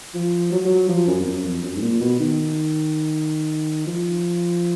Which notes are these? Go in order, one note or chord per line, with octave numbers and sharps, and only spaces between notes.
F3
F#3
F#3
F3
F#2
F2
F#2
F2
F#2
G#2
A#2
B2
D#3
F3